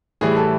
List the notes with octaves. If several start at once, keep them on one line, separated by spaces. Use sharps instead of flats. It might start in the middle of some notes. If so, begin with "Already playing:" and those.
A2 E3 G3 G#4
A4